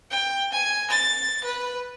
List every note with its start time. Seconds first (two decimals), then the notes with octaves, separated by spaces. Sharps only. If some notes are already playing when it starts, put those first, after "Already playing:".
0.11 G5
0.52 G#5
0.90 A6
1.44 B4